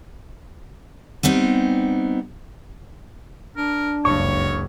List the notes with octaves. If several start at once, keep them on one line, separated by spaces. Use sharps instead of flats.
G3 B3 C4 D#4
D4 A#4
F#1 C#2 G2 C#5 C#6